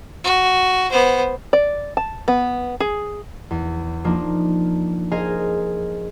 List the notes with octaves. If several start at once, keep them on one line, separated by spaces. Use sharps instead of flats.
F#4
B3 C5
D5
A5
B3
G#4
E2
F3 A#3 D4 D#4
G#4 A#4 C5 D#5 F5 G#5